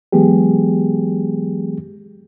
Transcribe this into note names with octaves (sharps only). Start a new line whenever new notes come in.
E3 F#3 G#3 B3 G4 G#4